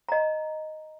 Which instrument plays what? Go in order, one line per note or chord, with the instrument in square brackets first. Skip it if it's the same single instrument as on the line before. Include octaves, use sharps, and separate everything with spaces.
[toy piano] D#5 A#5